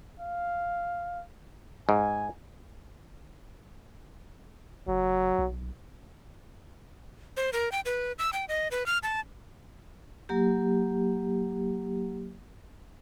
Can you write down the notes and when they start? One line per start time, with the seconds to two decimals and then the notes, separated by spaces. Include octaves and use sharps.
0.20 F5
1.89 G#2 G#5
4.88 F#1 F#3
5.39 B1
7.37 C5
7.53 A#4
7.72 G5
7.86 B4
8.19 E6
8.33 G5
8.49 D#5
8.71 B4
8.86 F6
9.03 A5
10.29 F#3 A#3 G4